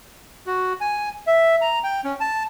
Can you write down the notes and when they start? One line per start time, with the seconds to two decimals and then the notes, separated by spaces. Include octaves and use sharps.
0.47 F#4
0.81 G#5
1.27 E5
1.61 A#5
1.84 G5
2.04 C#4
2.20 A5